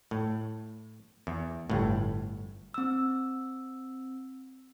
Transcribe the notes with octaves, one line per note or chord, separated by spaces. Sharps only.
A2
E2
G1 A2
C4 E6